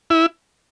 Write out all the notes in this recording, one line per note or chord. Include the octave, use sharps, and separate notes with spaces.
E4